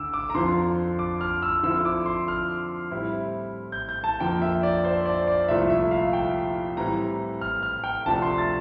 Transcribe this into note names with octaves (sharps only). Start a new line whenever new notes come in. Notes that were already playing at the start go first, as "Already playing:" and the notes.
Already playing: D2 D3 D6 E6
D6
A#5
F2 D3 F3 C4 F4 C6
D6
F6
E6
D3 F3 C4 E4 E6
D6
C6
F6
A2 G3 C4 E4
G6
G6
A5
F2 D3 F3 A#3 G5
E5
D5
C5
D5
D5
C2 A#2 F3 A3 E4 E5
E5
F5
G5
A2 E3 G3 C4 A#5
F6
F6
G5
D2 C3 F3 A3 D4 A5
C6
A6